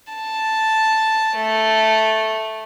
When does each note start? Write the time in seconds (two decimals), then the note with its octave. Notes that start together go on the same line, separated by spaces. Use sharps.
0.12 A5
1.36 A3